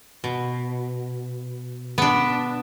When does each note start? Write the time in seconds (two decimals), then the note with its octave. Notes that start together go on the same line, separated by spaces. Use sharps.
0.24 B2
1.98 B3 D4